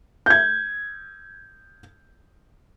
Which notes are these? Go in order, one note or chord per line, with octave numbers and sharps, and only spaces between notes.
G6 G#6